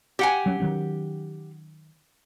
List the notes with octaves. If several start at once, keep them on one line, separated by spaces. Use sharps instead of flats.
G4 F#5 G#5
F#3 C#4
D#3 F#3 C#4